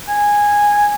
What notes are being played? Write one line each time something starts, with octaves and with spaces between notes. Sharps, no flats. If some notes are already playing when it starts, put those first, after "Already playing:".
G#5